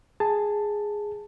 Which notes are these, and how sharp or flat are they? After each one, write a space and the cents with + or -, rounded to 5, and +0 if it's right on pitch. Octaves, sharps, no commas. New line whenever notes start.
G#4 +0 A5 +10